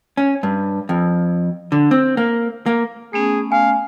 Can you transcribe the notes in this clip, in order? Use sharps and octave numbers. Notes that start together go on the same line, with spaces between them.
C#4
G2
F2
D3
C4
A#3
A#3
A3 B3 C#4 G#4
F5 G#5